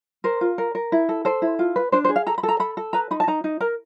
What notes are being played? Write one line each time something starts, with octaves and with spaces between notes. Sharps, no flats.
A#4 C5
F4
A#4
A#4
E4
A4
A4 C5
E4
F4
B4
D4 C5
C5
G#4
F5
A4 A#5
B5
A4
A#5
A4 B5
A4
B4 A#5
D#4 B5
A5
D#4 A#5
D#4
A#4 A#5